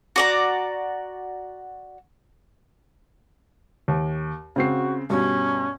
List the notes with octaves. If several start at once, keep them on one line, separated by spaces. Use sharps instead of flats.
F#4 D5 A#5
D#2
C#3 C4 F#4 C7
G2 B2 C#4